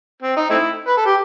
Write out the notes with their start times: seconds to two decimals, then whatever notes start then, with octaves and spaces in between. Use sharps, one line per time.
0.22 C4
0.36 D#4
0.50 A3 C4 E4
0.88 B4
0.97 A4
1.06 G4